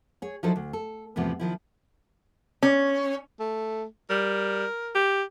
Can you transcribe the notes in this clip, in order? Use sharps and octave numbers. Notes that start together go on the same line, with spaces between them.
G#4 C#5
F3 F#3 D#4 E4 A4 C5
D2
A4
E2 A2 C3 F3 B3
D#3 F3 E4
C#4
A3
G3 A#4
G4